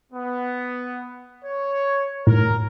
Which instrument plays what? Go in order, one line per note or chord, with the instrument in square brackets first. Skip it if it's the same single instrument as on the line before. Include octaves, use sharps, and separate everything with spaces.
[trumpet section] B3
C#5
[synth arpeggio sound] A2 [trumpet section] A#4